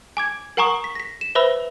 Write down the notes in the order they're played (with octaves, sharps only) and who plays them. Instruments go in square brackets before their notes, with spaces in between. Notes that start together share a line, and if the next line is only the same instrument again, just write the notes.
[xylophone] G#5 D6 G#6
A#4 F#5 G#5 A#5 C#6 D#6
B6
A#6 B6
E7
B4 C5 E5 B5 E6